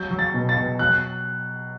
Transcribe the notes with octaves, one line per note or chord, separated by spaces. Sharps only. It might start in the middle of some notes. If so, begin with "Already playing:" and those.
Already playing: F#3 G6
F#3
A6
B2
A6
B2
F#3 F#6